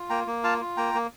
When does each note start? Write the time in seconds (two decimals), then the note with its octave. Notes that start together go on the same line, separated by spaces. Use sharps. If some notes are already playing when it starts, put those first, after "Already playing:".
Already playing: F4
0.10 A#3 G5 A#5
0.27 A#3
0.44 F4 F5 A5
0.61 F4
0.77 A#3 G5 A#5
0.94 A#3